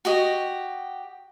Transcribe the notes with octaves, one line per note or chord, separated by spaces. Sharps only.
F#4 G4 D#5